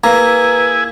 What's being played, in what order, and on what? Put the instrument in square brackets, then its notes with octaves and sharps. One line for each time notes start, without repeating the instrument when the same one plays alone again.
[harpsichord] A#3 [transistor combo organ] E4 G#4 G#5 [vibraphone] B4 [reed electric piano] A#5